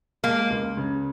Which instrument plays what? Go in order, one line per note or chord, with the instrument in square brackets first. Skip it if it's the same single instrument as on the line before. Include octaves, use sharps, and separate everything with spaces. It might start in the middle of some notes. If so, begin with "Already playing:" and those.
[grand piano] G#3 [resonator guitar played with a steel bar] A#3
[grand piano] C#2
C#3